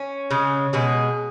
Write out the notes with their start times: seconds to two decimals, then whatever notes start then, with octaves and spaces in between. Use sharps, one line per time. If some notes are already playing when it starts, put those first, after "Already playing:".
Already playing: C#4
0.31 C#3 G#3
0.73 B2 G#3 G#4